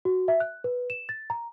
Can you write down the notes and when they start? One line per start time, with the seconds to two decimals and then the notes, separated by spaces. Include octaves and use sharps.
0.05 F#4
0.28 E5
0.40 F#6
0.64 B4
0.90 E7
1.09 A6
1.30 A#5